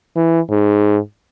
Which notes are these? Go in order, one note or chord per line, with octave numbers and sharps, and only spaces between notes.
E3
G#2